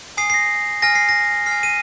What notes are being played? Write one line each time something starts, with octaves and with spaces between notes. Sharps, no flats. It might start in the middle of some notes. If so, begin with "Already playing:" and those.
G#5 D#6 C7
C7
A#6
G#5 F6 A#6
C7
A#6
G#5 F6 C7
D#7